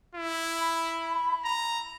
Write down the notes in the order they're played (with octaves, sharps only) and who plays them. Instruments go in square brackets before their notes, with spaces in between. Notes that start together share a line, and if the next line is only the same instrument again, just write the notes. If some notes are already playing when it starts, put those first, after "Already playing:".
[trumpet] E4
[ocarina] B5
[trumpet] A#5